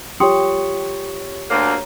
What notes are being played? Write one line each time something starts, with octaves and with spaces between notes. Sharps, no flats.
F4 G4 C#5 G5 C6 C#6 D#6 C#7
D2 A#3 C#5 A#5